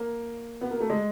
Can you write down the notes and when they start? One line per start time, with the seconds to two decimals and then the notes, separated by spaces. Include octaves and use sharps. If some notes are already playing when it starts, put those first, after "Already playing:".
Already playing: A#3
0.61 B3
0.71 A#3
0.80 A3
0.90 G#3